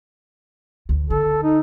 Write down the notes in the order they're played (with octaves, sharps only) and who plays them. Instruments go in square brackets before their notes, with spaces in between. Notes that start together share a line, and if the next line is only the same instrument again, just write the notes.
[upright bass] D2
[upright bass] D3 [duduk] A4
[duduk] D#4